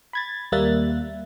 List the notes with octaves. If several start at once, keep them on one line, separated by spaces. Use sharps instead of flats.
B5 G#6 A6
D#2 G3 A#3 E5 F#6 A6